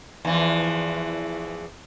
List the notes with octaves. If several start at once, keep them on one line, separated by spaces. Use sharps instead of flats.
E2 E3 F3